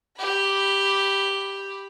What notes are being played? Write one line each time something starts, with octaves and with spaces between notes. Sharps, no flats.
G4 B5